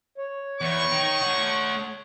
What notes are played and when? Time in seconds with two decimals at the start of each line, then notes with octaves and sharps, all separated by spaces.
0.18 C#5
0.61 E2 D#4 C#6
0.92 D#3
1.22 A3 F#5